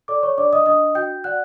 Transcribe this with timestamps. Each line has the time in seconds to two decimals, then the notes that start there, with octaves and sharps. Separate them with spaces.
0.08 A4 D5 D6
0.23 C#5 C#6
0.38 D4 D5 D6
0.53 D#5 D#6
0.66 D4 D#5 D#6
0.95 F#4 G5 G6
1.24 D5 F#5 F#6